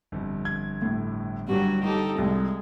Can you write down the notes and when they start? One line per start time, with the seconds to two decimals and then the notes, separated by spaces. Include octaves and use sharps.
0.12 G1 F2
0.45 G#6
0.82 A2
1.49 G2 F#3 G3 F#4
1.83 D#4 G4 A4
2.18 C2 G#3